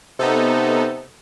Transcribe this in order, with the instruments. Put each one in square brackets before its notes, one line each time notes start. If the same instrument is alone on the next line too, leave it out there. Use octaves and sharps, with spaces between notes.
[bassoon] C3 [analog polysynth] B3 D#4 A4